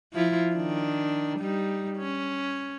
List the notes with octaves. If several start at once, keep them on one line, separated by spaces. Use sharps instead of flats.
F3 E4 F4
D#3 D4
G3 D#4
C#4